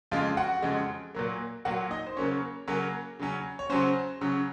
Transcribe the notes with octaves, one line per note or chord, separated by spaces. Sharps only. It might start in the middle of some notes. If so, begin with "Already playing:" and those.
F2 C#3 G#3 F4 F5
F#4 F#5
F2 C#3 G#3
A#2 F#3 A#3
A#2 F#3 A#3 F#4 F#5
D#4 D#5
C5
C#3 F#3 A#3 C#4 C#5
C#3 F#3 A#3 C#4
C#3 F#3 C#4
C#5
C#3 F#3 C#4 C5
C#3 F#3 C#4